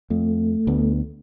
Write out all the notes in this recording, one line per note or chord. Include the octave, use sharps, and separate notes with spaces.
F2 A3
D2 B3